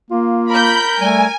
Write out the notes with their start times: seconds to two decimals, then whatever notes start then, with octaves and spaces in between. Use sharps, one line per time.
0.11 A#3 F4
0.49 A#4 B5 G6
1.00 G3 A3 G#5